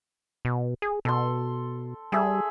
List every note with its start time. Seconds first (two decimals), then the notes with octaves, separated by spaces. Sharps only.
0.45 B2
0.82 G#4
1.05 B2 A4 C6
2.12 G3 G#4 A4 E5